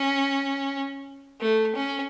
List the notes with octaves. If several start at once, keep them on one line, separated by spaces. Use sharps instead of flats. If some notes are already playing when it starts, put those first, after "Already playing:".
Already playing: C#4
A3
C#4